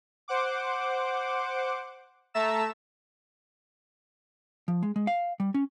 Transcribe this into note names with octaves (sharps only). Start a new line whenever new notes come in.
C5 F#5 D6
A3 E5 A5 A#5 E6 E7
F3
G#3
G#3
F5
G3
C#4